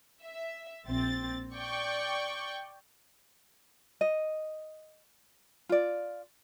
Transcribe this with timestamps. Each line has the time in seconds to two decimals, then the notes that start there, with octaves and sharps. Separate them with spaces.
0.22 E5
0.86 A#1 C4 A6
1.55 D5 G5 C#6
4.01 D#5
5.69 F4 D5